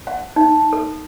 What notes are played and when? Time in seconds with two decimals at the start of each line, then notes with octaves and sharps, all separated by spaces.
0.07 F#5
0.36 D#4
0.73 A4